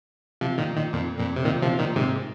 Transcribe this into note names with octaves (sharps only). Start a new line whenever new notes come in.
C3 F3
A#2 D#3
A#2 D#3
F2 A#2
F2 A#2
C3
A#2 D#3
C3 F3
A#2 D#3
G#2 C3